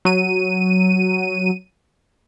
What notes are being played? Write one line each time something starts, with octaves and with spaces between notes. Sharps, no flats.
F#3 D#7